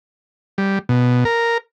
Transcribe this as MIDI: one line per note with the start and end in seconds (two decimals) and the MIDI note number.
0.58 0.79 55
0.89 1.24 47
1.25 1.58 70